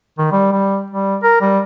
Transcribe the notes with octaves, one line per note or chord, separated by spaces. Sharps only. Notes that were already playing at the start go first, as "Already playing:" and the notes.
D#3
G3
G3
G3
A#4
G3